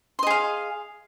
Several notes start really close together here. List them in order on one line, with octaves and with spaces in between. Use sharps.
C6 D#5 G#4 F5